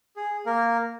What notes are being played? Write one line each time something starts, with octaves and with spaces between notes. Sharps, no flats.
G#4
A#3 A#4